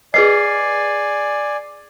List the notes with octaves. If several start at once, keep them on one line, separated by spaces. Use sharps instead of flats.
G#4 B4 D5 D#5 G#5 C7